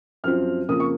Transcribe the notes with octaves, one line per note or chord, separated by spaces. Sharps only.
F#2 F3 C4 F6
F2 C#3 F3 A#3 D#6
C#6